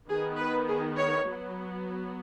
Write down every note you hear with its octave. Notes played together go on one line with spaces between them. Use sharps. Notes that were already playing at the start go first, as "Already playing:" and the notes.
D#3 B3 G#4
B4
G#4
C#5
F#3 B3